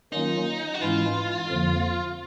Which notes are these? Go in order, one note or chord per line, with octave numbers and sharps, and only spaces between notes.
D#3 F#3 A#3 C#4 D#4 F4
F#4
G#2 E3 G#3 C#4 E4 F4
F2 D3 F3 A#3